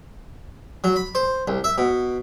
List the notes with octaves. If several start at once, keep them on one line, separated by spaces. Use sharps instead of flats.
F#3
B5
C5
C2
E5
B2